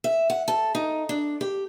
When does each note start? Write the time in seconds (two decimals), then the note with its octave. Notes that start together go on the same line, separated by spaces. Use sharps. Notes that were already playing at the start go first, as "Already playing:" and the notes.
0.04 E5
0.30 F#5
0.48 A4
0.75 D#4
1.09 D4
1.41 G4